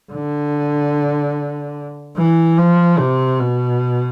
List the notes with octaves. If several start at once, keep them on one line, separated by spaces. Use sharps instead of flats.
D3
E3
F3
C3
B2